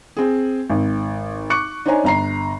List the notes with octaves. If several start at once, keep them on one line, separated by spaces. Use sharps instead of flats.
C4 G#4
G#1
C#6 D6 F#6 C#7
D4 D#4 C5 C#5 G#5 A#5
G1 A#5 C7